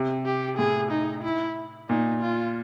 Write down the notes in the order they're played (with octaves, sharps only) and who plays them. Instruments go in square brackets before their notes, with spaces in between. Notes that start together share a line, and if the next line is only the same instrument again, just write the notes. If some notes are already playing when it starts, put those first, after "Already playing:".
Already playing: [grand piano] C3
[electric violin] G4
[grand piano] A2 [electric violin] G#4
[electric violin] D#4
E4
[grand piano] A#2 [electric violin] D#4
[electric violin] F4